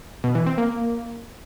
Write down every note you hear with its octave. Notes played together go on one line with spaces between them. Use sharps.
B2
E3
C4
A#3